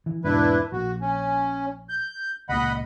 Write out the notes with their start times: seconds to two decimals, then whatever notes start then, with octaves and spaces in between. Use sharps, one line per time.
0.06 E3
0.24 E2 G#2 B2 D4 E4 B4
0.72 A#1 F#4
1.01 C#4
1.89 G6
2.49 C#2 A#2 D#5 F#5 B5